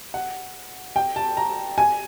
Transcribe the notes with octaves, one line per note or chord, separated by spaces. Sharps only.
F#5
G5
A5
A#5
G#5